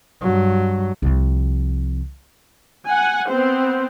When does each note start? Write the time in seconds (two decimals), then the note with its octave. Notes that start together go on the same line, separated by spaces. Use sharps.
0.22 G2 F#3
1.02 C2 F3
2.87 F#5 G#5
3.28 B3 C4 C5